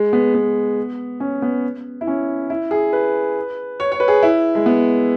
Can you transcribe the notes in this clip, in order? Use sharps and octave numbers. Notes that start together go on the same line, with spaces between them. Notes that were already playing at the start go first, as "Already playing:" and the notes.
Already playing: G#3
B3
B3
C#4
B3
E4
C#4
E4
G#4
B4
C#5
C#5
B4
G#4
E4
G#3
B3